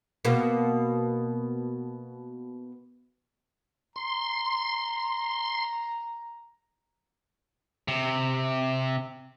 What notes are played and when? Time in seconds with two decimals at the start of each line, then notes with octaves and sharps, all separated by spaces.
0.25 B2 A#3
3.96 A#5 C6
7.88 C3